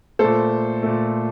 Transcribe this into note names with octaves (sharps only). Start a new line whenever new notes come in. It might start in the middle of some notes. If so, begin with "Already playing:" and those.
A#2 A3 A4 C5
A#2 A3